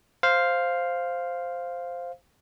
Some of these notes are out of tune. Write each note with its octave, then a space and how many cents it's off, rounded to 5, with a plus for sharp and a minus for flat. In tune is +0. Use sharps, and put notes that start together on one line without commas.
C5 +0 F5 +0